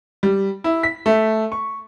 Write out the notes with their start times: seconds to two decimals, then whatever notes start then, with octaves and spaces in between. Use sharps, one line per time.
0.23 G3
0.64 E4
0.83 B6
1.06 A3
1.52 C#6